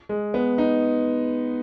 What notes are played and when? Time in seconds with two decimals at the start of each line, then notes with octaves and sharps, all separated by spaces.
0.09 G#3
0.34 B3
0.58 D#4